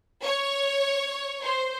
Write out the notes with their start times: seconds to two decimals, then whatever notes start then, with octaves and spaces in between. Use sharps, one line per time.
0.23 C#5
1.42 C5